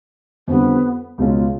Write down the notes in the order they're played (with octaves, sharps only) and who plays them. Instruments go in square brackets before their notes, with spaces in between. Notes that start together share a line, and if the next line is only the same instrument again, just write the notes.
[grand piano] F2 D3 G3 [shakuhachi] B3
[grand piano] C#2 B2 G#3 C#4 F4